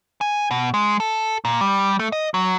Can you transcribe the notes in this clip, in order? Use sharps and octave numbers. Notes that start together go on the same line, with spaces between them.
G#5
B2
G#3
A4
A#2
G3
A3
D#5
F#3